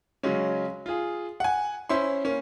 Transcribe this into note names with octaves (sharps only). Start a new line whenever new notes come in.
C#3 F#3 G#3 C#4
F4 G#4
F#5 G#5
C#4 E4 C5 C6
A#3 C#4